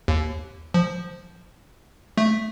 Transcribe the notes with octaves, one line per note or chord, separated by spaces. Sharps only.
D#2
F3
A3